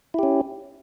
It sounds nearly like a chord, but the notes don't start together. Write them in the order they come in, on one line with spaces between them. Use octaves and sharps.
E4 G4 C#4